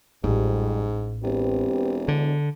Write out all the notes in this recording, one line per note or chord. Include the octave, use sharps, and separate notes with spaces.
A1 F2 G#2 G3 G4
E1 C4 G4 B4
D3